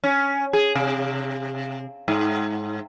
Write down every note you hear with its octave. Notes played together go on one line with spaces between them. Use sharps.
C#4
G#4
C3
G#2